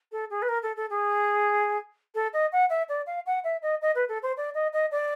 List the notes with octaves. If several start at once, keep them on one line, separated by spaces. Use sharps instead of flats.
A4
G#4
B4
A#4
A4
A4
G#4
A4
D#5
F#5
E5
D5
F5
F#5
E5
D#5
D#5
B4
A4
C5
D5
D#5
D#5
D5